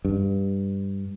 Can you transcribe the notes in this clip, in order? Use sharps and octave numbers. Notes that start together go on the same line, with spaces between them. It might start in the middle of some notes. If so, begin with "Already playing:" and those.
G2